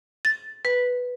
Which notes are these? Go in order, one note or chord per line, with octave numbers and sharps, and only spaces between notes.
A6
B4